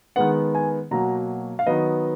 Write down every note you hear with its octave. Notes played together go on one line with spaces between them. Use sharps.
D#3 G#3 B3 F#5
G#5
B2 F#3 A#3 A#5
F5
D#3 F#3 B3 D#5